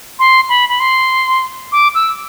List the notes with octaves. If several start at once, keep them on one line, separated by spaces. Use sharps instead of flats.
C6
B5
B5
C6
D6
E6